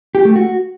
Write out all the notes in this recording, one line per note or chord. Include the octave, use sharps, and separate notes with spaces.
G4
A3
F#4